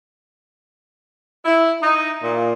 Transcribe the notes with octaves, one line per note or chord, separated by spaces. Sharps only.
E4
D#4
A#2